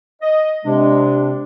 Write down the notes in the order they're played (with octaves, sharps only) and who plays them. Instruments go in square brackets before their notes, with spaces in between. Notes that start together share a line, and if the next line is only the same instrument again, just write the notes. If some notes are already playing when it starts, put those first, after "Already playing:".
[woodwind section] D#5
[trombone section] C3 D4 [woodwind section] G#3